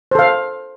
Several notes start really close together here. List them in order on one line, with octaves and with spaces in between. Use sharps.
C5 A4 F5